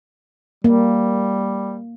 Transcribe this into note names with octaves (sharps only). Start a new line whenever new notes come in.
G3 A#3